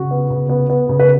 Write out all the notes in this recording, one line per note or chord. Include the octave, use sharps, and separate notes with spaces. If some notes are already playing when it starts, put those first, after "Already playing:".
Already playing: C#3 F#4
B3
C#3
B3
B3
C#3
B4